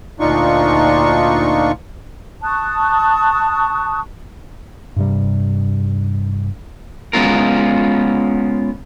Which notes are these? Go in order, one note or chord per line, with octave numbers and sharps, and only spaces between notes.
D2 A#2 D4 D#4 F4 C#6
A5 C#6 D#6 F#6
G2 C3 G3
G#3 B3 C#4 F4 A#4